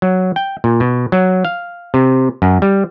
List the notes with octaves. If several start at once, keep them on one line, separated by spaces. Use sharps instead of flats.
F#3
G5
A#2
B2
F#3
F5
C3
F#2
G3